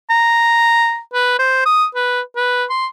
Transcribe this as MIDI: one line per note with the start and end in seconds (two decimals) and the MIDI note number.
0.10 0.99 82
1.13 1.38 71
1.39 1.63 72
1.66 1.86 87
1.95 2.21 71
2.36 2.64 71
2.70 2.87 84